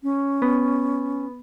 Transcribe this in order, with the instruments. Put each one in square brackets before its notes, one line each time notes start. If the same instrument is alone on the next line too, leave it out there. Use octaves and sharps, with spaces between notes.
[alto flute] C#4
[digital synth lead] B3